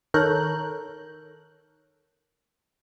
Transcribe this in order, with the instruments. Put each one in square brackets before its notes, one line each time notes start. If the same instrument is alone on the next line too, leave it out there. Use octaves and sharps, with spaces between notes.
[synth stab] D#3 A4 A#4 C#5 F#6 G6